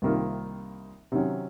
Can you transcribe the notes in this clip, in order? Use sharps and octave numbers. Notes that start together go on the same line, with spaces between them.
C2 C3 D#3 A#3 F4
C3 D#3 F#3 C#4